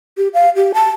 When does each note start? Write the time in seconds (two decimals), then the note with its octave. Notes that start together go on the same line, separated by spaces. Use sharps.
0.18 G4
0.34 F5
0.56 G4
0.74 A5